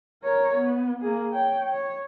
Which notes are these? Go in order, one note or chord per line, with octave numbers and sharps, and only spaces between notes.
A#4 C#5
B3
A#3 G#4
C#5 G5
C#5